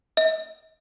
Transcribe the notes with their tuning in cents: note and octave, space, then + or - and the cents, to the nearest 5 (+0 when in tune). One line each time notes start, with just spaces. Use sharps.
D#5 +45